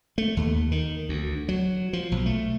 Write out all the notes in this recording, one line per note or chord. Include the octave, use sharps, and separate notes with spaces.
A3
D#2
D#3
D2
F#3
F3
B1
A3